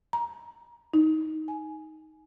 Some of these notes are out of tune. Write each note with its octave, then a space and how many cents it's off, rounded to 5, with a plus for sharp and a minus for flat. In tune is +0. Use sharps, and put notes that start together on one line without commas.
A#5 +15
D#4 +10
G#5 +15